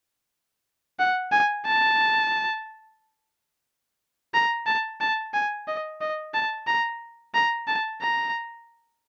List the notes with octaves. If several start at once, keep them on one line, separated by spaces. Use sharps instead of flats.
F#5
G#5
A5
A#5
A5
A5
G#5
D#5
D#5
A5
A#5
A#5
A5
A#5